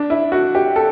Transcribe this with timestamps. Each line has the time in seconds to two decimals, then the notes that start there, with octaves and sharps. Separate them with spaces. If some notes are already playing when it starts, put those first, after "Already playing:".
Already playing: D4
0.10 E4
0.32 F#4
0.55 G4
0.76 A4